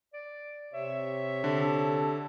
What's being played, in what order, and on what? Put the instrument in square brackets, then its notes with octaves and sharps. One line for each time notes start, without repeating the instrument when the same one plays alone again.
[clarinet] D5
[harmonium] C3 C#5 [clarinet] E5
[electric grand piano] D3 [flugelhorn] A4